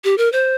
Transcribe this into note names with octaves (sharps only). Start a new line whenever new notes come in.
G4
A#4
C5